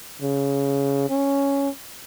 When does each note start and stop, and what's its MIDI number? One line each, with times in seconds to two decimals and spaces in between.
0.22 1.05 49
1.10 1.69 61